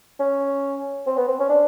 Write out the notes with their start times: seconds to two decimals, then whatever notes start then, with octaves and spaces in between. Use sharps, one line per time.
0.20 C#4
1.07 C4
1.17 B3
1.28 C4
1.40 C#4
1.49 D4